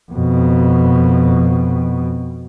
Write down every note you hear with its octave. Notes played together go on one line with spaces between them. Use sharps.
F2 B2